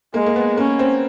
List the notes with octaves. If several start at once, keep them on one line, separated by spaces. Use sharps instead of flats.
G#3 A#3
A#3
B3
A#3 C#4
C4